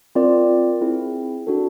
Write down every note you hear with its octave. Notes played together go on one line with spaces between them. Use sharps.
C4 F4 A#4 D5
C4 E4 G#4
D4 F#4 A4